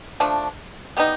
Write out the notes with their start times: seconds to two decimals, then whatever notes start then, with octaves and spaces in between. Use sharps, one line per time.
0.20 F3 A3 D4
0.97 G3 B3 D#4